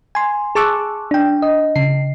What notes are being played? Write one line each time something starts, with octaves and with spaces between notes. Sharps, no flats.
G#5 C6
G#4 A5 C#6 D6 E6 F#6
D4 G5
D#5
C#3 C7